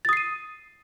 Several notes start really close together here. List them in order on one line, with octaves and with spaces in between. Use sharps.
A6 D#6 C7 D#7